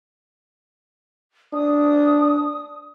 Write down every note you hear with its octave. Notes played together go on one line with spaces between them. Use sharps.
D4 D#6